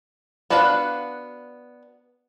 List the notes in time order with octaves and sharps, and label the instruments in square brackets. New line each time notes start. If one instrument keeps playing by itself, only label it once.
[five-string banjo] B3 D4 F#4 B4 F5